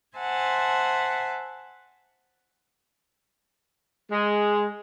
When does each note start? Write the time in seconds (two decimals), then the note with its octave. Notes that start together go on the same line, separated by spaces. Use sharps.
0.18 C5 E5 F#5 G#5 A5
4.12 G#3